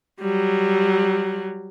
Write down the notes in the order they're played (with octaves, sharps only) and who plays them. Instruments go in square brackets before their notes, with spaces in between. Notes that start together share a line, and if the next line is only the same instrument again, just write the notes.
[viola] F#3 G3